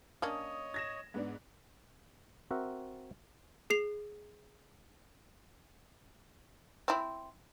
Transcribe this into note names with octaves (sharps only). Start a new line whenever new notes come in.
A#3 C#4 D4 C#5 D#5 D#6
G#6 A#6 E7
G#2 B3 D4
C4 F#4 A#4 E5 F#5
G#4 C7 F7
C4 E4